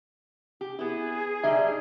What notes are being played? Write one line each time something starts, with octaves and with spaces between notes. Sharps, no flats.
G4
B3 E4 G#4
D3 G3 D#4 E5